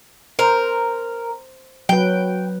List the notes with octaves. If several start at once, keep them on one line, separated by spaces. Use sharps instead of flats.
A#4 C5
F#3 B4 G5